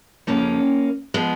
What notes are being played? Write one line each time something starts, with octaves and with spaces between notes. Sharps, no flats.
F2 C#3 F3 A#3 C#4
F3 G#3 B3